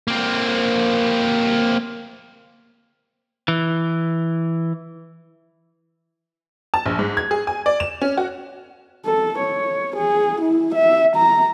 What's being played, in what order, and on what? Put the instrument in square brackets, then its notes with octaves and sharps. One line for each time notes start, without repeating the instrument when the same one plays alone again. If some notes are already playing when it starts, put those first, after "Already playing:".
[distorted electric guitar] A#3 C4
[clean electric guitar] E3
[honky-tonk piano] A5
A#1
G#2
G#6
G#4
G#5
D5
E7
C#4
F#4
[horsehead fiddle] A4
C#5
G#4
E4
E5
A#5